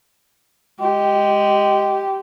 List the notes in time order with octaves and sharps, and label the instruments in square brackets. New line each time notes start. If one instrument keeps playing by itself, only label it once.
[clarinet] G#3 [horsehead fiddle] G4